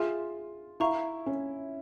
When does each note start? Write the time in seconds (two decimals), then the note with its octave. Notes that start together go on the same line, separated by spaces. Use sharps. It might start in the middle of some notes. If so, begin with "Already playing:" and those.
Already playing: F4 G#4 E5 G#5 C6 F6
0.80 E4 F5 A#5 C#6
1.26 C#4